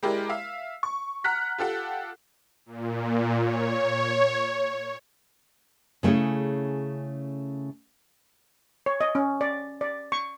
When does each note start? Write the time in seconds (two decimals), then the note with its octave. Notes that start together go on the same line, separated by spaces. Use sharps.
0.03 G#3 E4 G4 A#4 D5
0.29 E5 F5
0.83 C#6
1.24 F#5 A#5 F6 F#6 B6
1.58 F4 G4 A4 F#5
2.66 A#2
3.39 C#5
6.03 C#3 A3 C#4 E4 G#4
8.86 C#5
9.01 D#5
9.15 C#4
9.41 D5
9.81 D5
10.12 C#6